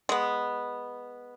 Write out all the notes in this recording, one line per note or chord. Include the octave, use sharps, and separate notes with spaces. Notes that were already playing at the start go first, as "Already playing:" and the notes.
G#3 B3